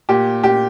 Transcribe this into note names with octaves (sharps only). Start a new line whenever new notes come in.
A#2 G4
A#2 G4